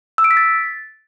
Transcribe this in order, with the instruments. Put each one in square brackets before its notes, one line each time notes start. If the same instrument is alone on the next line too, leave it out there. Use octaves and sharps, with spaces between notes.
[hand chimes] E6
D7
B6
A6